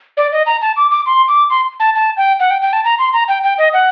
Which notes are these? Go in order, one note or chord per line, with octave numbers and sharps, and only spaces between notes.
D5
D#5
A#5
A5
D6
D6
C6
D6
C6
A5
A5
G5
F#5
G5
G5
A5
A#5
C6
A#5
G5
G5
D#5
F#5